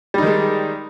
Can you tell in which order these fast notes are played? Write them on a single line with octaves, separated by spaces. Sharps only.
G3 D#4 D#3 G#3